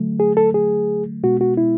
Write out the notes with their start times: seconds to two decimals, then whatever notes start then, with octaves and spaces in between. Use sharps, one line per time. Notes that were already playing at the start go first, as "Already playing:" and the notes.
Already playing: D3 F#3 A3
0.20 G#4
0.37 A4
0.54 G#4
1.23 B2 G#3 B3 F#4
1.41 F#4
1.57 E4